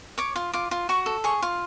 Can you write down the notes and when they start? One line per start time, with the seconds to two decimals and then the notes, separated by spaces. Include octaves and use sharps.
0.18 C#5 D6
0.36 F4
0.53 F4 D6
0.71 F4
0.89 F#4 C#6
1.06 A4
1.24 G#4 C#6
1.42 F4